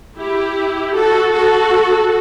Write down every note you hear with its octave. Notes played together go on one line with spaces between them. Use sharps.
E4 G4
F#4 A4
F#4 A4